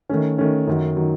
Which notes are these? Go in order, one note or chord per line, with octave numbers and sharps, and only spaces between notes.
D#3 A3 C#4
D#3 A3 C#4
F#2 D#3 F#3
D#3 F#3